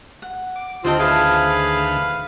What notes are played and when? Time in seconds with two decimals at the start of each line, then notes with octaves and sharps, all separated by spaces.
0.22 F#5
0.56 D6
0.85 D2 D3 D#3 C4 F4 G4 D#5 A5
1.00 E4 G#4 A4 B4 C5 F5